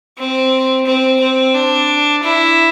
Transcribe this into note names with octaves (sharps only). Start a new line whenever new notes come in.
C4
C4
C4
D4
E4